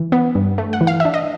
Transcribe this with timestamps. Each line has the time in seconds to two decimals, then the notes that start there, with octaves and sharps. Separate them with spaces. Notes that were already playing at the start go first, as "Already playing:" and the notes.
Already playing: E3
0.12 B3
0.35 G2
0.58 A3
0.73 F#5
0.81 E3
0.87 F5
1.00 D4 E5
1.14 D#5